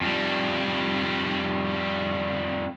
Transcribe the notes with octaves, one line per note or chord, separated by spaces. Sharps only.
F2 G3